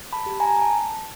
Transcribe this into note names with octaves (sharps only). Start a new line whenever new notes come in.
A5 B5
G4
G#5 A#5
A5